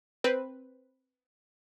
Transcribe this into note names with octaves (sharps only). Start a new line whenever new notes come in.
C4 B4 C5